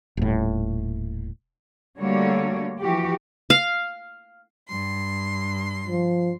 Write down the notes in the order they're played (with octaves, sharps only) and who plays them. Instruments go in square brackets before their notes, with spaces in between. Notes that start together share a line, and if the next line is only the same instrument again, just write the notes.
[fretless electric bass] D#1 A2
[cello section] D3 G3 A3 A#3 F#4 C#5
E3 F3 F#4 G4
[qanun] F5
[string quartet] G2 C6
[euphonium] F3